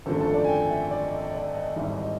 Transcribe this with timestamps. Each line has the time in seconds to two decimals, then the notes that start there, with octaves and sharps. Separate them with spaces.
0.06 G#1 F#2 D3 F3 A3 A4
0.20 A4
0.34 D5
0.44 G#5
0.48 G5
0.70 E5
0.91 D5
1.05 D#5
1.19 D#5
1.34 D5
1.55 D#5
1.76 G#1 G#2 E3 G3 E5
1.97 D#5